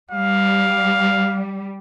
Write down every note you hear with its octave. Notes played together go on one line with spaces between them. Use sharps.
G3 F5